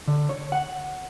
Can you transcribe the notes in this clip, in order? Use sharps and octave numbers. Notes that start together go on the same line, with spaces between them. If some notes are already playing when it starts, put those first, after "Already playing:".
D3
C#5
F#5